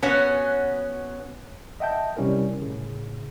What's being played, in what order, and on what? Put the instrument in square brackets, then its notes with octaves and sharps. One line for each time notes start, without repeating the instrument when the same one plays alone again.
[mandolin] B3 F#4 F#5 [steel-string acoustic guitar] C#4
[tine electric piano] D#5 E5 F#5 G5 A5 G6
C3 G3 C#4 E4 A#4
A2 C#3